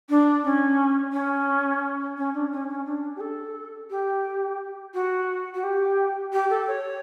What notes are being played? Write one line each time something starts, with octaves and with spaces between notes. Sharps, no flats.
D4
C#4
C#4
C#4
D4
C#4
C#4
D4
G4
A4
G4
F#4
F#4
G4
G4
A4
C#5